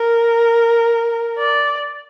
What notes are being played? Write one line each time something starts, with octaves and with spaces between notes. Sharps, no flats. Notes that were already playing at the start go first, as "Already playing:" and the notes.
Already playing: A#4
D5